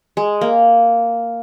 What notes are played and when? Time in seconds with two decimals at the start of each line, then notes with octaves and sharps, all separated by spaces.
0.17 G#3
0.41 A#3